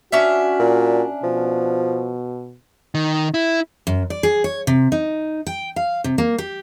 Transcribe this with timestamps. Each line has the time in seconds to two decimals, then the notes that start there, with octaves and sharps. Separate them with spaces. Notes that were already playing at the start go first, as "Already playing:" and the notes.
0.12 C#4 D4 F#4 E5
0.59 A#2
1.23 B2 F3
2.95 D#3
3.34 E4
3.87 F#2
4.10 D5
4.23 G#4
4.44 C#5
4.67 C3
4.92 D#4
5.47 G5
5.76 F5
6.04 C3
6.18 A#3
6.38 G4